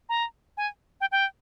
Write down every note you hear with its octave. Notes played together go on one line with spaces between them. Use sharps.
A#5
G#5
G5
G5